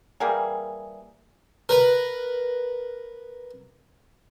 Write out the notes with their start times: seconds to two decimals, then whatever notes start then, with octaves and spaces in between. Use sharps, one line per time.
0.20 E3 G3 A#3 G#4
1.69 A#4 B4